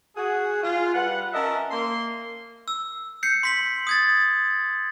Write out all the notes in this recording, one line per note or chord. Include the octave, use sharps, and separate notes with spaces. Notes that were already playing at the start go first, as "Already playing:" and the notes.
F#4 G#4
F4
G3 B4 F#5
C#4 A#4 D#5 E5 A5
A#3 C6
E6
G6 C7 C#7
C6 B6 F#7
D#6 G#6 A6